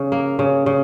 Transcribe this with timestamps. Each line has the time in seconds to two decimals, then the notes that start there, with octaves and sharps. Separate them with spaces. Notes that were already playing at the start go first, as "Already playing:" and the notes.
Already playing: C#3
0.12 A#3
0.39 C#3
0.66 C#3